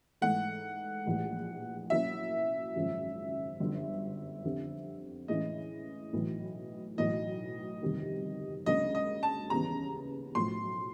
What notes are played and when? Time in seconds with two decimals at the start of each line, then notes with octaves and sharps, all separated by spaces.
0.21 G#2 E3 A3 F#5
1.06 A#1 A2 E3 G3
1.90 B2 F#3 A#3 C#4 E4 E5
2.76 G#1 F#2 C#3 F3
3.60 G1 F#2 D3 F3
4.44 F2 D3 G3 C4
5.28 A2 E3 G#3 C#4 E4 D#5
6.13 B1 A2 E3
6.97 B1 A2 E3 D#5
7.82 G1 F2 C3 D#3
8.66 C#2 C#3 F#3 A#3 D4 D#5
8.95 D#5
9.23 A5
9.50 D#2 C#3 E3 G3 B3 A#5
10.35 B1 A2 F3 C6